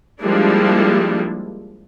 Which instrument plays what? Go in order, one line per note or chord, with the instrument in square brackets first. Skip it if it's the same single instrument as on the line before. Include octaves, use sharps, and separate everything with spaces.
[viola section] F3 G3 G#3 A#3 D4 E4